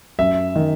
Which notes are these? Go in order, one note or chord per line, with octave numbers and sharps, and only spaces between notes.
F#2 E5
D#3